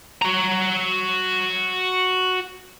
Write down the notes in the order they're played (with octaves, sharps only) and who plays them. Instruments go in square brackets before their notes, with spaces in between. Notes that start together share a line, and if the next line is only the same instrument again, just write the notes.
[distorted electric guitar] F#4 A#5